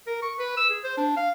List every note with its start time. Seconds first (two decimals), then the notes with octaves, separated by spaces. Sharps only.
0.07 A#4
0.22 C#6
0.39 B4
0.57 E6
0.70 G#4
0.84 C5
0.97 D4
1.17 F5